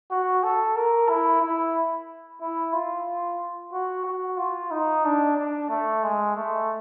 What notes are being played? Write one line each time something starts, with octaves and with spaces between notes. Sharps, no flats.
F#4
A4
A#4
E4
E4
E4
F4
F#4
F#4
F4
D#4
D4
D4
A3
G#3
A3